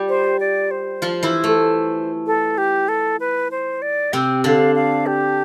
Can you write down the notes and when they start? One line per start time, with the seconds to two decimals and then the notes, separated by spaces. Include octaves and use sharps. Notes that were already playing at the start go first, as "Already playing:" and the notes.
Already playing: G3 F4 G4
0.09 C5
0.40 D5
0.71 C5
1.02 F3 F4
1.23 E3 E4
1.44 A3
2.27 A4
2.58 G4
2.88 A4
3.20 B4
3.51 C5
3.82 D5
4.13 C3 C4 G5
4.44 D3 D4 F5
4.75 F5
5.06 G4